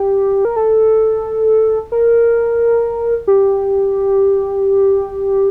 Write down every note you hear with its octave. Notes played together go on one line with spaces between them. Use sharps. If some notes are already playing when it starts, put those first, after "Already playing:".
Already playing: G4
A#4
A4
A#4
G4